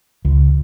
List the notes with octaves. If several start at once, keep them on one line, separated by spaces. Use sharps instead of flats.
C#2